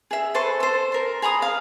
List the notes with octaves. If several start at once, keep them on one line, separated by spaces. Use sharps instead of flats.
G#4 E5
A4 B4 C5 C#6
A4 C5
A#4 C6
G#4 A#5 B5 D#6
F5